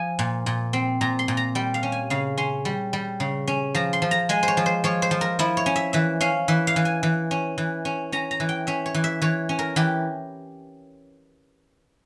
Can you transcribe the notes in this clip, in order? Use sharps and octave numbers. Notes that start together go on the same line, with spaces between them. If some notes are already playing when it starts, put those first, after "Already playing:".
Already playing: F3 G#5
A#2
A#2
C4
A#2 A#5
C6
A#2
A#5
G3 G5
F5
C#4
G#5
C#3 F5
C#4 C6
G3
G3
C#3
C#4
F3 A#5
C6
F3
A#5
G#3 G#5
C5
C#5
F3
C5
F3 C#5
C5
F3
A#4
F3 E4
C#5
C#4
E5
E3 E5
C#4 F5
E3 E5
F5
E3
G#5
E3
C#4
E3
C#4
C#4 A#5
A#5
E3
G5
C#4 E5
C#5
E3
E5
E3 C#5
C#4
A#4
E3 G4